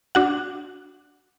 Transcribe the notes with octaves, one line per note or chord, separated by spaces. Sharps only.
D4 F#4 F#5